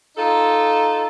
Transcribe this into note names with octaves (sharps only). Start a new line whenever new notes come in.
D#4 F4 A4